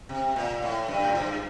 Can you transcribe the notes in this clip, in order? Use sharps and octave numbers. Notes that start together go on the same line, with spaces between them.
C3
A#2
A2
G2
A2
G2